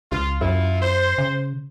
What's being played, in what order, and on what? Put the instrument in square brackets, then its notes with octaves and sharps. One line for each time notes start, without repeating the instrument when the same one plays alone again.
[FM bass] C#2 [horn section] F4
[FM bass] F#2 [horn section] E4 F4
[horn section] C5
[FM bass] C#3